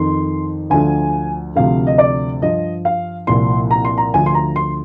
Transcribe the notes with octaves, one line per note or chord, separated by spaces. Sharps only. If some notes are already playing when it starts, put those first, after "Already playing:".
Already playing: F2 D#3 C6
D2 D3 F3 G#5
D2 C3 F3 F5
D#5
D5
G2 F3 D#5
F5
C2 A#2 F3 C6
A#5
C6
A#5
D2 D3 F3 G#5
C6
A#5
C6